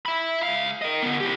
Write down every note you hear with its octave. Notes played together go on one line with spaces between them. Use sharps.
E5 B5
C#2 F5
A#4 D#5
D3 B3
E4 G4